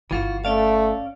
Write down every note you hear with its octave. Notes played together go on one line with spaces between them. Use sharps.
G1 E3 F4 F#4
A3 C#4 D5 F5